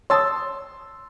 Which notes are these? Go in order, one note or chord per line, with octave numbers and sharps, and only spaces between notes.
C#5 A5 C6 D#6 E6 A6